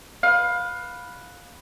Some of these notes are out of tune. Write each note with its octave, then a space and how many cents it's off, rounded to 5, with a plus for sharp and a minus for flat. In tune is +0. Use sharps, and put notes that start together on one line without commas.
B4 +0 F5 +20